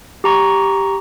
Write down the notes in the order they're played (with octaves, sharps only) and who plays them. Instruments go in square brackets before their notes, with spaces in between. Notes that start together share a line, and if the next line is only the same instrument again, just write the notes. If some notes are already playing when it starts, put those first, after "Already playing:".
[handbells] G4 A#5 C#6